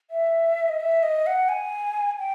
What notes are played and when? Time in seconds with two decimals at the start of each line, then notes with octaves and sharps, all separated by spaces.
0.11 E5
0.69 D#5
0.80 E5
1.03 D#5
1.26 F#5
1.49 G#5
2.19 G5